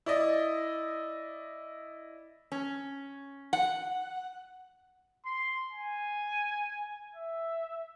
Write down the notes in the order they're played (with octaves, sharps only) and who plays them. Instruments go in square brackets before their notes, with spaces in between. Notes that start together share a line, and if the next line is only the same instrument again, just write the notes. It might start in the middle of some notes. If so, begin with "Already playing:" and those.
[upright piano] E4 D5 D#5
[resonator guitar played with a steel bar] C#4
F#5
[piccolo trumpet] C6
G#5
E5